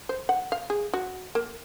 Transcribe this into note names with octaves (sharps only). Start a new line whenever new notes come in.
C5
F#5
F5
G#4
F#4
A#3